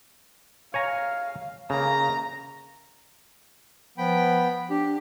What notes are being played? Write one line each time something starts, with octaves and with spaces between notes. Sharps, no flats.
C#5 F5 G#5 A#5
C#3 A#3 A#5
F3 B3 G5 B5
D4 G4